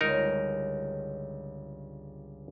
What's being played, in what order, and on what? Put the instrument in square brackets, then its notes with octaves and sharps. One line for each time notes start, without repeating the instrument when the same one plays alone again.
[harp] G1 C#2 C#5 [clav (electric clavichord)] D#4 A#4